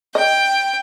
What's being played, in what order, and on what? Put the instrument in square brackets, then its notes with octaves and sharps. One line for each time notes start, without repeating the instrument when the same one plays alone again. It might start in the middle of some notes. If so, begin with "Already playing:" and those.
[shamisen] D#5 [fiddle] G5